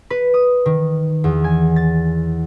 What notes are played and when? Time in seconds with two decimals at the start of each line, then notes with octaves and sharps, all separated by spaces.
0.10 B4
0.34 D#6
0.66 D#3
1.24 E2
1.44 G#5
1.76 A6